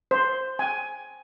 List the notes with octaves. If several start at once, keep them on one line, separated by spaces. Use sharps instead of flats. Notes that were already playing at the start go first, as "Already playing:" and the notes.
C5
G5 G#5